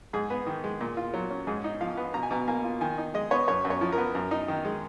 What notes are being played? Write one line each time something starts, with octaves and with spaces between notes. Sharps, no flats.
G#2 G#4
B3
D#3
G#3
A#2
F4
F#3
C#4
G#2 G#4
D#4
F3 F5
B3
B2 A#5
G#5
B2 A#5
A#3 G#5
F4
D#3 G#5
D#4
G#3 D#5
B3 C#5
F#2 C#5
F#2
C#5
F3
A#4
B3
F#2
D#4
D#3
G#3